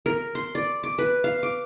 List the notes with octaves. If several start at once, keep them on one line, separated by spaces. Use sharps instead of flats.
A#4
C6
D5
D6
B4
F5
D6